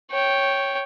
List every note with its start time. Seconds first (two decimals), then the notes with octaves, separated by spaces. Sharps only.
0.11 C#5 G5